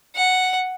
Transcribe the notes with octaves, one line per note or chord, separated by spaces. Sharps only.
F#5